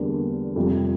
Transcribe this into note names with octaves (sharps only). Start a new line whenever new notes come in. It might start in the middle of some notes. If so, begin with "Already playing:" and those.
Already playing: E2 D3 G3 A#3
F2 C3 G3